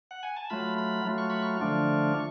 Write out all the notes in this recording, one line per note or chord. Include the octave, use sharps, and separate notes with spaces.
F#5
G#5
A5
F#3 A3 F4 B5
B5
F#3 A3 F4
C#6
B5
C#6
D3 F3 A3 D4 F4